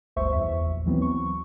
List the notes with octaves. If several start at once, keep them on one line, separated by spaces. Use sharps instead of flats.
G1 D2 C5 E5 C#6
E2 E5
A#1
D#2 E3 F#3 B3 C4
C#6